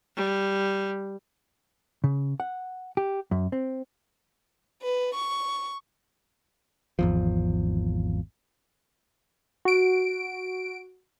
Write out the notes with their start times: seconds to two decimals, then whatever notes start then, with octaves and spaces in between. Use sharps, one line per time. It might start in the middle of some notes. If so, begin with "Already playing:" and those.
0.16 G3
2.04 C#3
2.40 F#5
2.97 G4
3.31 F#2
3.52 C4
4.82 B4
5.15 C#6
6.99 G#1 E2 F3
9.65 F#4 D7